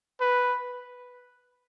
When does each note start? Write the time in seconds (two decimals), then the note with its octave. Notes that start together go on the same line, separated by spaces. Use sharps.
0.21 B4